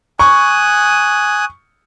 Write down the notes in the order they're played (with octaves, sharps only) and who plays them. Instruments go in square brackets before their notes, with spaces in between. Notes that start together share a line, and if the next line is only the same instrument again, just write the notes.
[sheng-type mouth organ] G#5 D#6 F#6 [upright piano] C#6